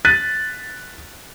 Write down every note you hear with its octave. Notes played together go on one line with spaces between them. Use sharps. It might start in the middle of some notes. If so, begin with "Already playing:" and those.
F#6 A6 B6 D#7